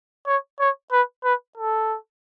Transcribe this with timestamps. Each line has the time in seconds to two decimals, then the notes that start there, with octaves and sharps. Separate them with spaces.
0.27 C#5
0.60 C#5
0.92 B4
1.24 B4
1.57 A4